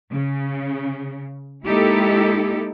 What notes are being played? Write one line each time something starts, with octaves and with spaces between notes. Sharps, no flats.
C#3
G#3 A#3 D#4 E4 G4 A4